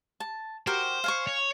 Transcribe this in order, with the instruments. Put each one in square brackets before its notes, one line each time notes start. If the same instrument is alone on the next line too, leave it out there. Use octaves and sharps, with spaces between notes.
[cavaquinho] A5
[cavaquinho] F#4 G4 A#4 [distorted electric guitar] C5
[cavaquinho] F5 G#5 C#6
[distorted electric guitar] C#5